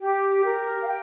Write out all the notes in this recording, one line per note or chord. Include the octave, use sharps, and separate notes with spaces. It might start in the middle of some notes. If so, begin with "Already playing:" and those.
G4
A#4
F5
G5